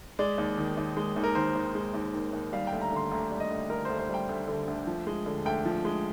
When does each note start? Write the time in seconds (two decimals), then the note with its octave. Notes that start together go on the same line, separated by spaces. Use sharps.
0.19 G#3 D5
0.38 D#2
0.58 D#3
0.77 D#2
0.97 G#3
1.16 D#2
1.23 A#4
1.35 D#3 C5
1.55 D#2
1.75 G#3
1.94 D#2
2.14 D#3
2.33 D#2
2.53 G3 F5
2.67 D2 G5
2.81 A#5
2.92 D3 C6
3.11 D2 A#5
3.31 G3
3.40 D#5
3.50 D2
3.70 D3 A#4
3.85 D2 C5
3.99 C5
4.09 G3
4.14 G5
4.29 D2
4.48 D3
4.68 D2
4.87 F3
5.07 G#3
5.26 D3
5.45 D2 G5
5.65 F3
5.85 G#3